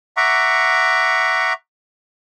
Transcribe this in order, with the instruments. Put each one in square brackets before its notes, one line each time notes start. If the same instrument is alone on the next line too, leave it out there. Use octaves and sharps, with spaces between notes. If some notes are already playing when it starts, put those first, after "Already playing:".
[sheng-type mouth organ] E5 F#5 A#5 C#6 D6